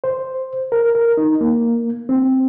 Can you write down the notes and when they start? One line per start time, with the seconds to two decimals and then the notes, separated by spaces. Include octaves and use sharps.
0.04 C5
0.72 A#4
0.95 A#4
1.17 D#4
1.41 A#3
2.09 C4